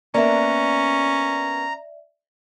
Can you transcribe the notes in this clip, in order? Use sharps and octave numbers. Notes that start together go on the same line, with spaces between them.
A#3 B3 C#4 D4 D5 E5 A#5